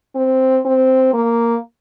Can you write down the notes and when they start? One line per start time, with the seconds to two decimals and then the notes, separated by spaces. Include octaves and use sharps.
0.16 C4
0.65 C4
1.13 A#3